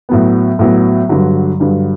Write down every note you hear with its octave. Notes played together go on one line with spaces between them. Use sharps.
A2 F#3 B3
A2 F#3 B3
G2 D3 F#3
G2 D3 F#3